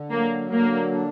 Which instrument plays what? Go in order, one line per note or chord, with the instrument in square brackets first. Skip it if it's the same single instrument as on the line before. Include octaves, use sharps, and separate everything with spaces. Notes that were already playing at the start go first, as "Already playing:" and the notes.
Already playing: [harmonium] D3
[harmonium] F#3 [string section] A#3
[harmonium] D3 [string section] A#3
[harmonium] D4